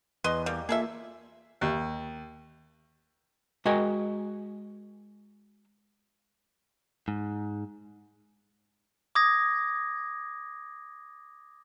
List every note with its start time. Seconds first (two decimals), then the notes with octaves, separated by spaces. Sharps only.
0.24 E2 B4 D#5 C6
0.46 G3 A#3
0.69 A#3 F4 G#4 A4 E5
1.61 D#2
3.65 G#3 F#4 A#4 D#5 G5 G#5
7.08 G#2
9.15 D6 D#6 G#6 A#6